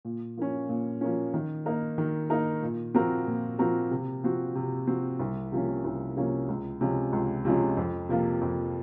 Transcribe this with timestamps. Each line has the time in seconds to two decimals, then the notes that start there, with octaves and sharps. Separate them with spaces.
0.05 A#2
0.37 F3 A#3 C#4
0.69 A#2
1.01 F3 A#3 C#4
1.34 D#3
1.66 A#3 D#4 A#4
1.98 D#3
2.30 A#3 D#4 A#4
2.63 A#2
2.94 F3 C4 F#4 A#4
3.27 A#2
3.59 F3 C4 F#4 A#4
3.91 C3
4.23 F3 C4 F#4
4.55 C3
4.87 F3 C4 F#4
5.20 C2
5.52 C3 F3 A#3 C#4
5.84 C2
6.16 C3 F3 A#3 C#4
6.49 C#2
6.81 C3 F3 G#3 C#4
7.13 C#2
7.45 C3 F3 G#3 C#4
7.77 F2
8.09 C3 F3 A#3 F4
8.41 F2